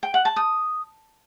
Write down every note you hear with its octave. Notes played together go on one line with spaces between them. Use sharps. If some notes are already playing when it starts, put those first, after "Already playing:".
G5
F#5
A5
D#6